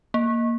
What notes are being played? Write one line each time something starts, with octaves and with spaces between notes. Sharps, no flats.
A#3